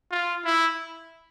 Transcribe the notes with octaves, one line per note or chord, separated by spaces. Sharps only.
F4
E4